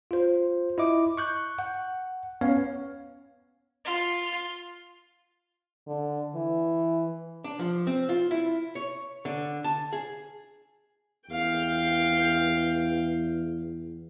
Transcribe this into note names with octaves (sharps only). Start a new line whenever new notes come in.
F4 C5
E4 D#5 D6
C#6 F#6 G6
F#5
B3 C#4 C#5 F5
F4
D3
E3
D4
F3
C4
F4
E4
C#5
D3
A5
G#4
E2 F5 G5